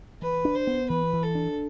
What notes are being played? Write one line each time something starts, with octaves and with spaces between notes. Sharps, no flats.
E3 B4
D4
C5
B3
E3 B4
E3
A4
D4